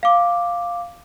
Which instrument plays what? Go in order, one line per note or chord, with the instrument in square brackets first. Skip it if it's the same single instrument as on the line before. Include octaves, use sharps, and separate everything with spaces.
[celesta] F5 D6